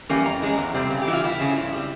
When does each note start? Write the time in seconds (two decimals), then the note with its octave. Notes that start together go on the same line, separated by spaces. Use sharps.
0.09 E3 G3 A#3 C#4
0.25 F2 A#5
0.42 E3 G#3 C#4
0.58 E2
0.74 C3 G3 C4
0.90 C#3
1.02 G4
1.07 E3 E4
1.11 G3 F4
1.24 E2 E4
1.39 C#3 F3
1.56 G2
1.73 G3 C4